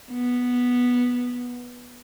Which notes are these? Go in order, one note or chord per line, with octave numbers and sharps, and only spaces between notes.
B3